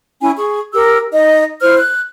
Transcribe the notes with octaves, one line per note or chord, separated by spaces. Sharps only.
C#4 E4 G#5
G#4 C#6
G4 A#4 E6
D#4 D#5
E4 C5 F6
F#6